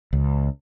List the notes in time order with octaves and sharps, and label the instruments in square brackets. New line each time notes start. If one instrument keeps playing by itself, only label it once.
[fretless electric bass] C#2